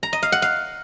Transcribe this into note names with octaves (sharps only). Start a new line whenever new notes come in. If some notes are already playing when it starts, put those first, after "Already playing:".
A#5
D#5
F5
F#5
F5